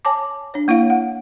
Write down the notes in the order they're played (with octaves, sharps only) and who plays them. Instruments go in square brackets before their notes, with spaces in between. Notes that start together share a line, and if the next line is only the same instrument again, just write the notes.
[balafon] C#5 G#5 A5 D6
D4 C#5
A#3 E4 C#5 F5
F#5